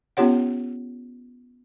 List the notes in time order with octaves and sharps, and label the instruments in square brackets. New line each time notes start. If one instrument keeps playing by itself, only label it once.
[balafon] B3 C#4 F4 G4 C#5 F#5